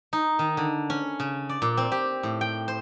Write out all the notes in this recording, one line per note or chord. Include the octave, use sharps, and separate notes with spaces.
D#4
D#3
D3
C#4
C#3
D5
A#2
C4
G4
A2
G5
C5